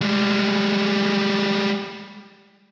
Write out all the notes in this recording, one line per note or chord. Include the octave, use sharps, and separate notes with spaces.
G3 G#3